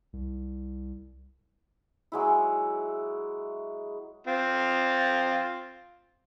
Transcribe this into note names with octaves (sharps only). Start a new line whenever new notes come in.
C2
F#3 G#3 E4
C4 F4